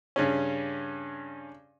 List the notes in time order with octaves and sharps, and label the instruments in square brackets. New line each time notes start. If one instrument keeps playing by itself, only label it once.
[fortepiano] G2 C#3 C#4